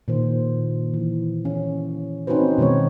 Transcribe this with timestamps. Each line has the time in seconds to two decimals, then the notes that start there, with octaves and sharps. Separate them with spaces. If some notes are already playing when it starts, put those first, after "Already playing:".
0.08 A#2 D#3 C5
0.94 E3
1.45 C#4
2.27 C4 C#4 D#4 F#4 B4 C5
2.58 B2 D#3 G#3 B3 C#5